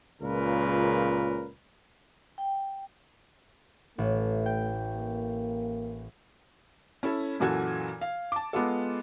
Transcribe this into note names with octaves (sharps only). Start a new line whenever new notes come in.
C#2 A#2 C#3 F4 A#4 B4
G5
A1 A3
G5
A#3
C#4 E4 A4
F#2 A#2 E3 F#4 A4 G#6
F5
A5 D6
G#3 B3 F4 A4